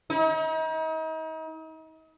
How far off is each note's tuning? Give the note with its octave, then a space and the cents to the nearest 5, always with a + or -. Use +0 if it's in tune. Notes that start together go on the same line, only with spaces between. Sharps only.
D#4 +40